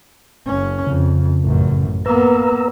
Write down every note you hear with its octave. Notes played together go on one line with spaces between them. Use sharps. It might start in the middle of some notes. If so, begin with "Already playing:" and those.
F#1 C#4
F2 C#3
A1 F#2
A#3 B3 B4 A#5 E6